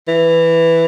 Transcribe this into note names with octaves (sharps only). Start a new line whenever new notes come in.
E3